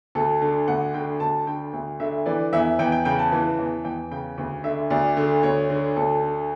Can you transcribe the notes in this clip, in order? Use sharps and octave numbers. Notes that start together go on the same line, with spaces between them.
D2 A4
D3
D2 F#5
D3 G5
D2 A5
D3 G5
D2
D3 E5
E3 D5
E2 E5
E2 G5
G5
C#3 G5
A5
E3
E2
E2 G5
C#3 G5
D2
D3 E5
D2 D5
D3
D2 C#5
D3
D2 A4
D3